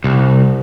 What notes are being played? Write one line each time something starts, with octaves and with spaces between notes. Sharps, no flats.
C2